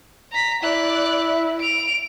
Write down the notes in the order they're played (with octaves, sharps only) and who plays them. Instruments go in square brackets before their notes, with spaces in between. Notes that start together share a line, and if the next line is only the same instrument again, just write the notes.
[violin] A#5 B6
[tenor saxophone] E4 [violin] D5 F#6
[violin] D7 F7